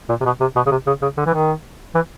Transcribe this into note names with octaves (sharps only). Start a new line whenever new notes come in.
A#2
C3
B2
C3
B2
C#3
C3
C#3
C#3
D3
E3
D#3
E3